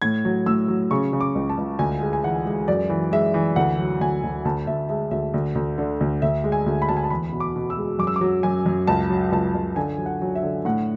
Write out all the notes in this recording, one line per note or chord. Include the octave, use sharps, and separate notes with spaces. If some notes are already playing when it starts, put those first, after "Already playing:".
A2 G#6
F#3
A2 E6
F#3
C#3 C#6
C#3
D6
C#2
A5
C#2
D2 G#5
G#3
G#5
E3 F#5
G#3
F#2 D5
E3
G#3 E5
E3
D2 F#5
F#3
D2 G#5
D2
D2 A5
D2 E5
G#3 E5
D2 E5
D2
D2
D3
D2
D2 E5
G#3
G#5
D2
B5
D2 A5
G#5
A5
E2 B5
B2
D6
B2
E6
G#3
F#2 D6
E6
D6
F#3
F#2 G#5
F#2
C#2 A5
F#3
C#2 A5
C#2
D3 G#5
F#3
F#5
F#3
E5
D3
A2 F#5